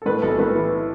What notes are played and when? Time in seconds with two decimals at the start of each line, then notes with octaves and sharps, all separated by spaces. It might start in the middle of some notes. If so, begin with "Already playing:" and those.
0.02 A4
0.06 A2 B4
0.22 B1 A4
0.39 A2 B4
0.55 E3